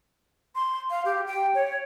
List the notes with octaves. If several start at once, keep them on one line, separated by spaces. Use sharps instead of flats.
C6
F5
G4
G5
C#5